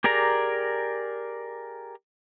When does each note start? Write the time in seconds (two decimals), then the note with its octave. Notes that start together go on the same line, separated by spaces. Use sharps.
0.04 G4 G#4 A#4 D5 A#5